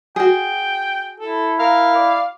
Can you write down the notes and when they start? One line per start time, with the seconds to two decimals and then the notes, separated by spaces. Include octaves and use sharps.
0.16 F#4 G#4 G5
1.20 E4 A4
1.59 A#4 F5
1.95 D5